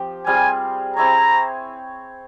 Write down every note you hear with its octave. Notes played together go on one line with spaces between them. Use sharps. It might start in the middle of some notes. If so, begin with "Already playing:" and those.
Already playing: F3 C4 G4
G3 C4 F4 G#4 G#5
C4 E4 G#4 C#5 A#5